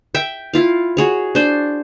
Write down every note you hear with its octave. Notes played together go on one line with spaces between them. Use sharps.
E5 G5
E4 F4 F5
F#4 G#4 C#5
D4 C5